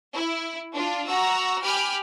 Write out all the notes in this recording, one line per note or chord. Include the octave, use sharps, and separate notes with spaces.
E4
D4 F4
F#4 A#5 E6
G4 G#5 B5 F6